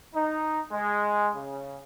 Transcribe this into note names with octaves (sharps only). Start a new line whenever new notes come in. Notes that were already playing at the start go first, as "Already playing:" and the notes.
D#4
G#3
C#3